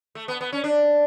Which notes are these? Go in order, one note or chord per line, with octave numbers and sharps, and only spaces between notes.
A3
B3
B3
C#4
D4